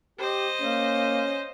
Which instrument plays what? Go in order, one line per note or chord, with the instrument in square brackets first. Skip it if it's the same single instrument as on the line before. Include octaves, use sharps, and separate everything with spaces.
[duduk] G4 [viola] C5 D#5
[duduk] A#3 [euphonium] C#4